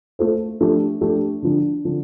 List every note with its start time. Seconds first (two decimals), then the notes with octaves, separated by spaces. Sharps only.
0.19 A3 F4 A4 C5
0.61 F3 A3 D4 G4
1.01 F3 A3 D4 G4
1.42 D3 F3 D4
1.85 D3 F3 D4